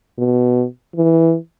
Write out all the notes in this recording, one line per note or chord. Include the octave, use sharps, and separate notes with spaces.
B2
E3